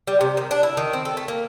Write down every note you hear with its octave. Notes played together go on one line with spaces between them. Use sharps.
G3
C3
D#3
D4
E4
D#3
C4
A4
A3
A#3